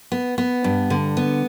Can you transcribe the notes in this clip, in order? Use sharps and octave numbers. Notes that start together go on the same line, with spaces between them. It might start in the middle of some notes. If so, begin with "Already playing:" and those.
B3
B3
G2
D3
B3